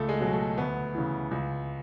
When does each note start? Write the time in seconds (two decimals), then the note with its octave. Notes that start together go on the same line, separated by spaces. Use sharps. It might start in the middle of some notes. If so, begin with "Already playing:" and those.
Already playing: C#2 A3
0.09 G#3
0.20 B2 F#3
0.33 A3
0.58 D2 B3
0.95 C#3 E3
1.31 C#2